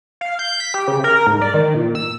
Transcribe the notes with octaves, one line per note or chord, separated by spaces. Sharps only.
F5
G6
B6
G4
C#3
A#4
G#2
D5
D#3
A#2
E6